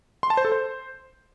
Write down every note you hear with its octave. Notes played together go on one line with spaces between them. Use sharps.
C6
A5
C5
A4
C5